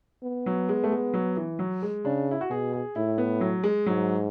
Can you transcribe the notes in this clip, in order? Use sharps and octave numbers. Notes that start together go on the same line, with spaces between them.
B3
F#3
G#3
A3
G#3
F#3
E3
F#3
G#3
C#3 D4
E4
F#4
B2 G#4
G#4
A2 E4
B3
F#3
G#3
G#2 F#3